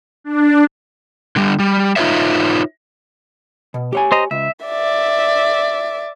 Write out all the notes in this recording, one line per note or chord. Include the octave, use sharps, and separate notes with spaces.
D4
D3 G3
G3
D#4 F4 G4 B4 C#5 E5
B2
G4 C#5 G#5
C5 D#5 A#5
C#2 E5
D5 E5